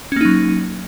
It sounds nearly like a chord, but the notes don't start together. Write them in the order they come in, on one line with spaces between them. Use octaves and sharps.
C#4 A#3 D#4 F#3